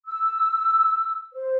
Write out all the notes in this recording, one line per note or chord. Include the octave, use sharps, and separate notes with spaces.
E6
C5